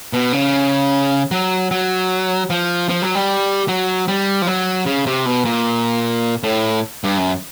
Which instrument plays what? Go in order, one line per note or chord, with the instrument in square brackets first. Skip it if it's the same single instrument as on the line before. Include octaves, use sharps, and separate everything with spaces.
[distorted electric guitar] B2
C#3
F#3
F#3
F3
F3
F#3
G3
F#3
G3
F3
F#3
C#3
C3
B2
A#2
A2
G2
F#2